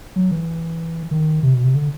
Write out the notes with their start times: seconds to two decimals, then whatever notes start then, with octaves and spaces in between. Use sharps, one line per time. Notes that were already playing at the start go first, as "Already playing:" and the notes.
0.16 F#3
0.31 E3
1.11 D#3
1.43 C3
1.54 B2
1.64 C3
1.75 D3